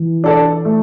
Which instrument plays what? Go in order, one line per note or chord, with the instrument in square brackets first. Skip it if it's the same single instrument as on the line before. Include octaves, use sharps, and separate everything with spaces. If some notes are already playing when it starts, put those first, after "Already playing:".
Already playing: [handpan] E3
[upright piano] D4 A4 D5
A3